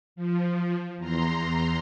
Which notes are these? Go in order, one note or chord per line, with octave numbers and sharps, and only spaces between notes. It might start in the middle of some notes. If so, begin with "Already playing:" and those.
F3
E2 A#5 C6